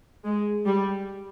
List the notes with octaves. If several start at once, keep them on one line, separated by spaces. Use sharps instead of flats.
G#3
G3